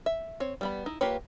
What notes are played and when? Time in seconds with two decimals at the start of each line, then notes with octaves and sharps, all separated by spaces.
0.06 E5
0.40 C4 C#5
0.61 G3 B3 B5
0.86 D#4 E4
1.01 A#3 F4 G4 B4 C#5